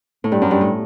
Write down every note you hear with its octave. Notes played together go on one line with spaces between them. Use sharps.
A2
G2
F#2
G2
A2